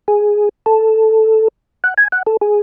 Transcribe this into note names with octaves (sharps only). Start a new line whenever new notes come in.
G#4
A4
F#5
G#5
F#5
A4
G#4